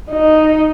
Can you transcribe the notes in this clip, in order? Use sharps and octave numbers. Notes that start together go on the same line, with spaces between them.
D#4